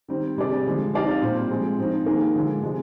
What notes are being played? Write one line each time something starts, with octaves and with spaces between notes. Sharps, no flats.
D#3 G3 C4
C3 G3 D4 G#4 D5
D3 F3 G#3 D4
C4 D#4 G4 D5 F5
A#2 G3 C4
F3 G#3 C4
F3 C4 D#4
D#3 A#3 D#4 G#4
D3 F3 G#3
C3 F3 G#3 D4